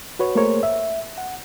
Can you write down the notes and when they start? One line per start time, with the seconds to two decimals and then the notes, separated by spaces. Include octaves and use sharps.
0.19 F#4 B4 C#5
0.35 A3 A#3 G#4 A#4 C5 C#5
0.63 E5
1.18 F#5